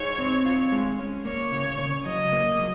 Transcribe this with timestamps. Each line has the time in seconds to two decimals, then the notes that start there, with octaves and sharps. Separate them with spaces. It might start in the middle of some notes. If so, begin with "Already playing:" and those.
Already playing: D#4 G#4 C#5
0.18 C4
0.45 F4
0.72 G#3
0.99 C#4
1.25 A#3 C#5
1.52 C#3
1.79 C#3
2.05 F#3 D#5
2.32 A#3
2.59 F#3